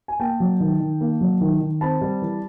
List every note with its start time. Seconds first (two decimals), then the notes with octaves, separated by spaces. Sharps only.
0.08 G#5
0.20 A#3 G5 A5
0.40 F#3
0.60 D#3
0.80 D#3
1.01 A#3
1.21 F#3
1.41 D#3
1.61 D#3
1.81 C4 A5 B5
2.01 G3
2.22 E3